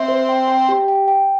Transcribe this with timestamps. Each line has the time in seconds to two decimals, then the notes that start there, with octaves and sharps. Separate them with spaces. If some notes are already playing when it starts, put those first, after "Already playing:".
Already playing: C4 E5
0.08 C5
0.29 G5
0.48 G5
0.69 G4
0.88 G5
1.08 G5